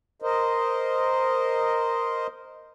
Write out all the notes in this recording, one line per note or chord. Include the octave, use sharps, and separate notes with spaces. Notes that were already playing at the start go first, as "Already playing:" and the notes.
A#4 C5 D#5